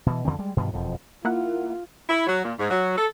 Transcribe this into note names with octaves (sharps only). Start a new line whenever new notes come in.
B2 E3
F2 D3 D#3 C4
G3 G#3
G2 B2 D#3 F3
E1 F2 F3
A#3 E4 F4 F#5
E4
F#3
A#2
G#2
F#3
A4